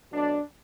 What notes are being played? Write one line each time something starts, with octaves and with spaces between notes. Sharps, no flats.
B2 F#3 A3 D4